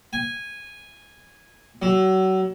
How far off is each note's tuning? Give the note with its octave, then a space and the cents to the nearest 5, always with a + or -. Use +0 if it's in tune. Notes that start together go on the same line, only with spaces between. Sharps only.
G#5 -10
F#3 +30